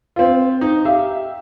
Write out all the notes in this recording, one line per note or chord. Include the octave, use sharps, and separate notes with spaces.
C4 F4
D#4
G4 E5 F5